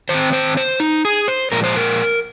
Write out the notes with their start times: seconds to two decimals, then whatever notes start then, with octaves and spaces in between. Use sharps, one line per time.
0.09 D#3 C4 C5
0.33 C5
0.57 C5
0.80 D#4
1.05 G#4
1.28 C5
1.52 A#2 F3 G#3 A#4
1.64 C5
1.76 A#4